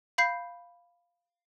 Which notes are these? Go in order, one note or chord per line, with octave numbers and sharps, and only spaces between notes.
F5 B5 G6 C7